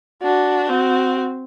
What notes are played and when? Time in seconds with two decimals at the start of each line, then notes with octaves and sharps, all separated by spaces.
0.23 D4 F#4
0.69 C4 F#4